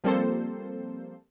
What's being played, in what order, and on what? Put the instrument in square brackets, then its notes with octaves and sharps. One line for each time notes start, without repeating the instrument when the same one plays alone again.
[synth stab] F3 G3 A#3 C4 A4 C5